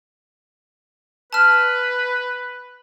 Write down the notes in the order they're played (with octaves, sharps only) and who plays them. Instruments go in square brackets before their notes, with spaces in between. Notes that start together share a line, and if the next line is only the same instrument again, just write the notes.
[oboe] B4 [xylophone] A5 F6